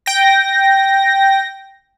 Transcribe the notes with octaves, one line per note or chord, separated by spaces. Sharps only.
G5 A#6